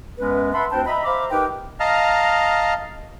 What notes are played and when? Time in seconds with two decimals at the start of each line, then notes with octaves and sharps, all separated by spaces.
0.18 F#2 G#3 B3 C#4 B4
0.53 B4 E5 F#5 A5 B5 C6
0.72 D2 C4 D4 C5 G5 A5
0.86 D#5 E5 A#5 B5
1.04 C5 E5 F5 A#5 B5 D6
1.31 D#4 G4 A#4 B4 G5
1.80 D#5 F5 A5 A#5 F6